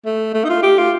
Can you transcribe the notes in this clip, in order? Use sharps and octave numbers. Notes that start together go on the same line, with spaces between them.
A3
A3
D#4
F4
G4
F4